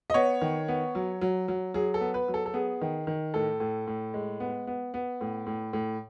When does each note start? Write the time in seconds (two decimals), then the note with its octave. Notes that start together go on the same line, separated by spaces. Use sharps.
0.10 D#5
0.14 B3 C#5
0.41 D#3
0.68 B3
0.95 F#3
1.21 F#3
1.48 F#3
1.74 F#3 G#4
1.94 A4
2.01 B3
2.14 B4
2.28 F#3
2.34 A4
2.46 A4
2.54 B3 G#4
2.81 D#3
3.07 D#3
3.34 A2 A4
3.60 A2
3.87 A2
4.14 G#3
4.40 B3
4.67 B3
4.94 B3
5.21 A2
5.46 A2
5.73 A2